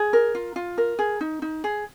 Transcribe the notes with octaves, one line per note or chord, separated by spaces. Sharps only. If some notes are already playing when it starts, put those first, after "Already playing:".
Already playing: G#4
A#4
F4
F4
A#4
G#4
D#4
D#4
G#4